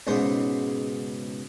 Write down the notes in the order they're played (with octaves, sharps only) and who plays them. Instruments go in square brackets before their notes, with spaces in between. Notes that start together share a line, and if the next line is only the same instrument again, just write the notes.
[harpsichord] B1 G#2 C#3 C5